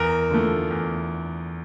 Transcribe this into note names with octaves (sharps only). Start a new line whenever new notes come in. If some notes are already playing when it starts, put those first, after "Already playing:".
Already playing: E2 A#4
D3 F3 A3
E2